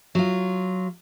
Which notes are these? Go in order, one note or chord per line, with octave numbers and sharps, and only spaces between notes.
F#3 F4